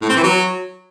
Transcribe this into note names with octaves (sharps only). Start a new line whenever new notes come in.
A2
C4
E3
F#3